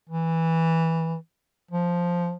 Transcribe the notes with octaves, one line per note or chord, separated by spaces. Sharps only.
E3
F3